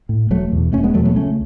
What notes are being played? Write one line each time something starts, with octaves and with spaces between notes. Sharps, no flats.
A2
E1 F#3 A3
E2 B2
E1 A3 C#4
G#3 B3
E2 B2 F#3 A3
F#3 A3
C#2 A3 C#4